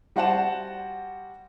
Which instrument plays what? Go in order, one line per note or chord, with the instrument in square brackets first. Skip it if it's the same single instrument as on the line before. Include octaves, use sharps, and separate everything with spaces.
[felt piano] G3 F#4 C5 F#5 A5 E7